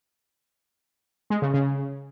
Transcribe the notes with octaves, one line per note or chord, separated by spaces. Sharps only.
G#3
C#3
C#3